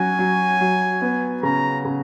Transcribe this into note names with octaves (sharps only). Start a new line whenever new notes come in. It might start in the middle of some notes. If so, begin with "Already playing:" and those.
Already playing: F#3 C#4 F#4 G#5
F#3
F#3
B3
C#3 A#5
C#3